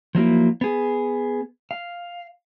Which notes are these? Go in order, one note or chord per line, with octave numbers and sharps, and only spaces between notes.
F3 F#3 A#3 E4
B3 G#4
F5